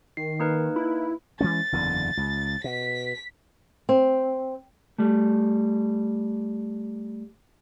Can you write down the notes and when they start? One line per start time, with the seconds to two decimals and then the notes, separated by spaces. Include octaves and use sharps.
0.17 D#3 C7
0.40 A#3 D#4 B4
0.76 E4
1.41 E3 G#3 C#4 A6
1.72 F#1 E2 D3
2.17 C#2
2.64 B2 B6
3.89 C4
4.99 G3 A3